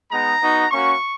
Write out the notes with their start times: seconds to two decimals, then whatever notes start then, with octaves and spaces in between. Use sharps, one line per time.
0.11 G#3 B3 D#4 A#5
0.41 B3 D#4 F#4
0.71 A#3 C#4 F#4 C#6